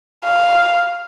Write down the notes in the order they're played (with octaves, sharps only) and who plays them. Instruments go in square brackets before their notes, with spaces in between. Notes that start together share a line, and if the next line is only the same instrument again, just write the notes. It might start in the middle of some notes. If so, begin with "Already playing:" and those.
[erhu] F5